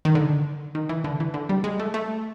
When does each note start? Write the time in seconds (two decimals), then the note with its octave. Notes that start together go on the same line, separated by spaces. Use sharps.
0.05 D#3
0.15 D3
0.75 D#3
0.89 E3
1.04 D3
1.20 E3
1.34 D3
1.49 G3
1.64 G#3
1.80 A3
1.94 A3